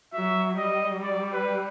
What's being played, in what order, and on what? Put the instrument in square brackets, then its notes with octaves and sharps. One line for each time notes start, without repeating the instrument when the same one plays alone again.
[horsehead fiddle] F#3 [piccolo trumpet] E5
[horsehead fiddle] G3 [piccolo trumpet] D#5
[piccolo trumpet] D5
B4